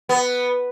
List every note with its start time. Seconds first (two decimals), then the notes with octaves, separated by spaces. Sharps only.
0.09 B3